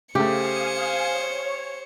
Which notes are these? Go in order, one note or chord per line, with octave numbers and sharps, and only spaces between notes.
C#3 A3 G4 C5 F5 G#5 D#6 C#7
C#5